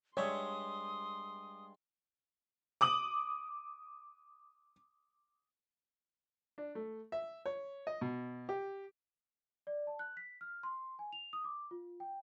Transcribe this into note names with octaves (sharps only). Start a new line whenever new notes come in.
G2 G#3 C#5 D5 E5 C6 D#6
D6 D#6 F#7
D4
A3
E5
C#5
D#5
B2
G4
D5
A5
F#6
B6
F6
C6
G#5
F7
D#6
D6
F4
G5